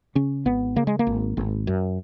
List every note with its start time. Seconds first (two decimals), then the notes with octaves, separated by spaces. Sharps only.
0.15 C#3 C#4
0.45 G#1 B3
0.76 C#3 A#3
0.87 G#3
0.99 A#3
1.07 G#1
1.37 G#1
1.67 F#2